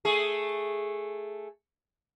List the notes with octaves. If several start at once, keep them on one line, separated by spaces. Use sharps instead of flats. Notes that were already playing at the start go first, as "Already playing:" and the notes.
A3 G#4